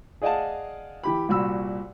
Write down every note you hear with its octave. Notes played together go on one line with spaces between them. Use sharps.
G#4 D5 D#5 F5 F#5 A5
E3 G4 B5
C2 A#2 F#4 B5 E6